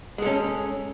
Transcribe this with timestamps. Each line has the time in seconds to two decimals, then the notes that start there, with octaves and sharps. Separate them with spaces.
0.18 G#3
0.22 A4
0.26 C#4